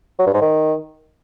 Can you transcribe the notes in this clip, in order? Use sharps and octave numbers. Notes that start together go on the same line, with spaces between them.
F#3
G2
G#2
D#3